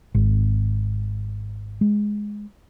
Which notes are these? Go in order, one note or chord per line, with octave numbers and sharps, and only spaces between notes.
G#1
G#3